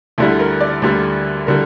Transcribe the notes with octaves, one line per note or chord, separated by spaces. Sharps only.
D2 D3 G3 E4
A#4
D5
D2 D3 G3
D3 G3 A#4